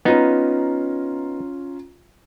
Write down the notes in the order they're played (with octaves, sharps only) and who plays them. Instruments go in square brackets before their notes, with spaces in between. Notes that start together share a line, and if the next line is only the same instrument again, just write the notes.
[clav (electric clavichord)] B3 D#4 [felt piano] C#4 F4 A#5